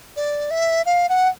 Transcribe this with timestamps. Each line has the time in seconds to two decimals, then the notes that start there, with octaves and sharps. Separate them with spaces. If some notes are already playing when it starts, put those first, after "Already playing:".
0.16 D5
0.51 E5
0.86 F5
1.09 F#5